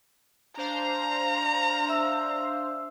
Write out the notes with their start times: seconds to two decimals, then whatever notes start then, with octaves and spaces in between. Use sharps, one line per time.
0.57 D4 C5 F5 A#5
1.89 E5 E6